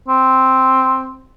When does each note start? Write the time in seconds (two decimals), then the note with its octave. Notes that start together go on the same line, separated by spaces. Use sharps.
0.08 C4